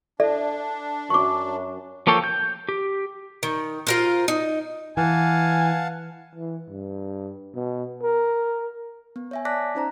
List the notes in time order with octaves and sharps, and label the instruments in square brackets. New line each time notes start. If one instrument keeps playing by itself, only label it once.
[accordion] D4 [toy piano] A4 D5 E5
[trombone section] F#2 [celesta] C#6 D6
[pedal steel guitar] F3 A#3 A4 C#5 G5
G6
G4
[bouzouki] D#3
F4 A#4 C5
D#4
[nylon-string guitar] E3 [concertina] F5 F#5 A5 [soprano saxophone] G#5
[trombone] E3
G2
B2
A#4
[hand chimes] B3
C#5 E5 G#5
D5 A5 D6 F#6 A#6 B6
C#4 D#4 C5 A#5